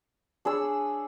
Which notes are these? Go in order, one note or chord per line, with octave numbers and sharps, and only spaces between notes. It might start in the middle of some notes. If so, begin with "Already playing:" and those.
D4 G#4 C#5 E6